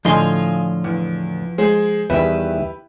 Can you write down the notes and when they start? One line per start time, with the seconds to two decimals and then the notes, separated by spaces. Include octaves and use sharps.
0.05 A2 D3 F3 F4 D#5 G#5 C6
0.84 E2
1.58 G#3 G#4 C5
2.10 E2 D#3 G3 E4 G4 B4 E5